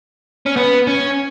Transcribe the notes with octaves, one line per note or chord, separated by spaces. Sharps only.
C#4
B3
C#4